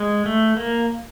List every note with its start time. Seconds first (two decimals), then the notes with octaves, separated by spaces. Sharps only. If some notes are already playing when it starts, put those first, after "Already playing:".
Already playing: G#3
0.26 A3
0.57 A#3